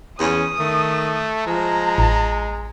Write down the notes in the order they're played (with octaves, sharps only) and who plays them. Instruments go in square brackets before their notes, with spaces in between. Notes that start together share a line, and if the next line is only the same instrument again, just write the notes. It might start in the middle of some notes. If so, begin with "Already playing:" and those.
[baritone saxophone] E2 [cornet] C#4 [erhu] D#6
[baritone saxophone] D#3 [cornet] A3
[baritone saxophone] F3 [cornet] G#3 [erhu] A#5
[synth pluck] A1